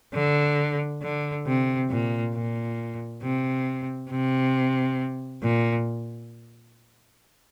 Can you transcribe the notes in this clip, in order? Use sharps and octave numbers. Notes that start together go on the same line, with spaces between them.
D3
D3
C3
A#2
A#2
C3
C3
A#2